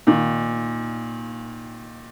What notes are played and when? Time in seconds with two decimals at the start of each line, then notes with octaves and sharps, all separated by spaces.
0.07 A#2 D#3